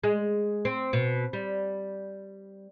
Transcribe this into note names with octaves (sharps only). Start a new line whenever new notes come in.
G#3
C4
B2
G3